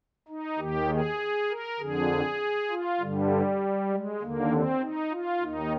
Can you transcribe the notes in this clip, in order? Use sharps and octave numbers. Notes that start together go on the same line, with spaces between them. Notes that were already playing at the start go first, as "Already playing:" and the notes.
D#4
D#2 D#3 G4
G#4
A#4
F2 D3 G#4
F4
G2 D3 G3
G#3
D#2 D3 A#3
C4
D#4
F4
D#2 D#3 D#4